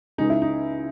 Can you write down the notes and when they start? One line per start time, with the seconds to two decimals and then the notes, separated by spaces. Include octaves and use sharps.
0.18 C#2 C#3 G#3 D#4
0.30 E4
0.42 D#4